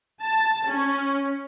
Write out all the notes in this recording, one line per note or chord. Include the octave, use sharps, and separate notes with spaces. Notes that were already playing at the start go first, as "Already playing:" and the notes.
A5
C#4